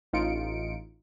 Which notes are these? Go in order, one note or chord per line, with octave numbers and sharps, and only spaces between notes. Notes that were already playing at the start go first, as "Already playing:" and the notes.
A1 D#4 F4 C#7 D7